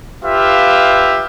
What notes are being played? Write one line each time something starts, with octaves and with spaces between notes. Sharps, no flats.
F4 G4 B4 E5 F5